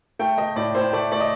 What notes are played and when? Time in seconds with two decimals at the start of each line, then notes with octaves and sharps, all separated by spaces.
0.19 A3 G5
0.38 A3 D#5
0.56 A2 D5
0.75 A2 C5
0.93 A3 D5
1.12 A3 D5
1.20 D#5